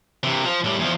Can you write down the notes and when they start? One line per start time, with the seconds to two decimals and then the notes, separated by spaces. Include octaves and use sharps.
0.24 C3 E3
0.44 F3
0.64 A2 G3
0.79 E2 F3